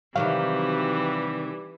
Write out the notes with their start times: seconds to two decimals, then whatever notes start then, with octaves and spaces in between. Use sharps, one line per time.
0.16 C3 D#3 E3 F#3 G3 G4 F5